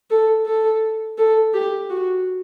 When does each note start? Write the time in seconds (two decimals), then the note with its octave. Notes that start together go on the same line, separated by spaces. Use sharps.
0.10 A4
0.46 A4
1.18 A4
1.54 G4
1.90 F#4